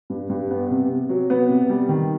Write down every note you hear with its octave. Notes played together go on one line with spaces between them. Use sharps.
G2
G2
B3
C3
C3
F#3
B3
C3
G3
D#3